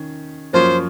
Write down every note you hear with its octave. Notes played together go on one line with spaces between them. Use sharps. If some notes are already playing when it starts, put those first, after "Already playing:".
Already playing: D#3 C#4
F#2 F3 A#3 C#4 F4 C5